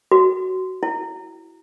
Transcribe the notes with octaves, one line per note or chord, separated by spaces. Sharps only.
F#4
E4